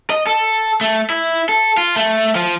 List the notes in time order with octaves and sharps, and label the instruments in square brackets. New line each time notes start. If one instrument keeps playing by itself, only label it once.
[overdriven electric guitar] D#5
A4
A3
E4
A4
F4
A3
F3